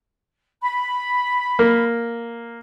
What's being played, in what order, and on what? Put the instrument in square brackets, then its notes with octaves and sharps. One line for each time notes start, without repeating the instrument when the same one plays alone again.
[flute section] B5
[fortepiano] A#3